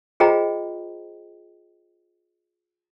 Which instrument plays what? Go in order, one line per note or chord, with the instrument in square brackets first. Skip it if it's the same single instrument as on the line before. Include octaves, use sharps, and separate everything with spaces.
[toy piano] F4 G#4 C5 D#5 G5 A#5